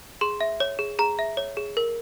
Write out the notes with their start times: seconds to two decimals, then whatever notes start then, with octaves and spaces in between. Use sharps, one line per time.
0.21 G#4 C6
0.41 E5
0.60 C#5
0.79 G#4
0.99 G#4 A#5
1.19 E5
1.37 C#5
1.57 G#4
1.77 A#4